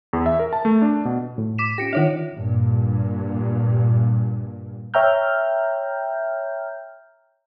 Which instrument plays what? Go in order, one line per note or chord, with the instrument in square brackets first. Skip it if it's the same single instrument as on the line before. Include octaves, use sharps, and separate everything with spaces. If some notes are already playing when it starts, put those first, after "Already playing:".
[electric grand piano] E2
E5
A#4
A5
A3
D4
B2
[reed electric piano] A2
[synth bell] D6 B6 E7
[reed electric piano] C#4 F4 G4 [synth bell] A#6 C#7 D7
[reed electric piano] D#3 D4 [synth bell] F4 C#5 E5
[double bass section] G2 A#2
[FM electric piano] C#5 E5 G5 A#5 F6 G6